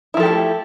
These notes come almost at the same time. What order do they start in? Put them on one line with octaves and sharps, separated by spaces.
E4 F3 A4 G4 A3